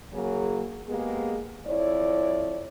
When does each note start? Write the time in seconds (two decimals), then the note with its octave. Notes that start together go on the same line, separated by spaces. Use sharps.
0.12 C#3 F#3 A#3 G#4
0.87 G#3 A#3 B3 G4 G#4
1.65 F2 E4 C#5 D5